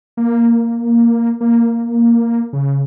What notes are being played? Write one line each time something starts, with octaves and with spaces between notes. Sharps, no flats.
A#3
A#3
C#3